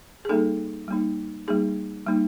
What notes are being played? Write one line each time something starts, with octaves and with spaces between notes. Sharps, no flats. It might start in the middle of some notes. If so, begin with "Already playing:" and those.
G#4
G3 A#3 D#4 A4
G3 A#3 D#4
G3 A#3 D#4 G#4
G3 A#3 D#4